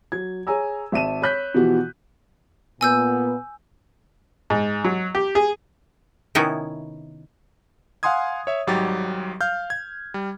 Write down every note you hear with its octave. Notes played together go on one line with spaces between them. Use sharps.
F#3 G#6
G#4 C#5 G#5 A#5 E6
G#1 E5 A5 D#7 E7
C#5 B5 F#6 G6 B6
B2 E3 F3 B3 F#4 G4
A#2 B3 G#5 E6 G6
G#2
F#3
G4
G#4
C3 D#3 B3 C#4 D#4 E4
F5 F#5 G#5 C6 D#6 G#6
C#5 E5
G#1 G#2 F#3 G3 G4 A6
F5 F6 G6
G#6
G3